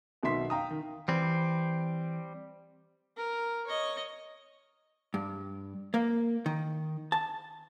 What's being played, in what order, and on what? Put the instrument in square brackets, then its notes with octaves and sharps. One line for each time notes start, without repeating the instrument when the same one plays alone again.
[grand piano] B1 B2 D#3 E5 C6 B6
F5 G5 A#5 D#6
D#3
[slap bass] E3 [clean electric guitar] G3 C4
[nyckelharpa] A#4
C#5 D#5
[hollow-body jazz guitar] G2
A#3
D#3
A5